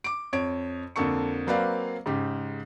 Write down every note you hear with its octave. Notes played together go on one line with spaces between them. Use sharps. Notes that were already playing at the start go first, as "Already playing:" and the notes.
D6 D7
F2 C#5 D7
F2 D3 A#3 A4 C#6 C#7
F#3 A#3 C4 B4 D5 F5
G#2 C#3 G4